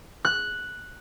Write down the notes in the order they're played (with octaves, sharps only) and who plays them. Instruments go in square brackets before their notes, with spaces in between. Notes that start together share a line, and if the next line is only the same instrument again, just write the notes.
[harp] F#6